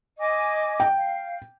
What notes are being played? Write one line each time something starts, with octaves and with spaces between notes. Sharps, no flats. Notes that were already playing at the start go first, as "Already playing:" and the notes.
D#5 G#5 D6
G5
F5